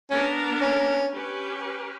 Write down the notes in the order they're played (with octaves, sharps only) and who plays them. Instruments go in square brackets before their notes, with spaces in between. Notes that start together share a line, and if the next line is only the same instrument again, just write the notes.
[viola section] B3 D4 A#4 [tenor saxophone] C#4
[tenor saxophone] C#4
[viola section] C#4 G4 B4